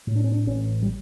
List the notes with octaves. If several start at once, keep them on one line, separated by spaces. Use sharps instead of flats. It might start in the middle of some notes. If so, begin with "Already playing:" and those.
A2
D4
C#4
D4
A1 C#4
G3